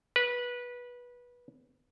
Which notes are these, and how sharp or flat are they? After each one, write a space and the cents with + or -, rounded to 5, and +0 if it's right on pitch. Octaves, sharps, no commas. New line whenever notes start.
B4 -20